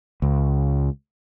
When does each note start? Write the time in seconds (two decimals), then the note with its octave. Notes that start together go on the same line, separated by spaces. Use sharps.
0.22 C#2